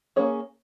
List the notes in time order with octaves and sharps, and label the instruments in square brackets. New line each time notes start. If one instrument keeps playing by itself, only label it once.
[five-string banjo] A#3 C#4 G#4 C#5